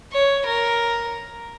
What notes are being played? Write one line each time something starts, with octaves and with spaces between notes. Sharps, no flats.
C#5
A#4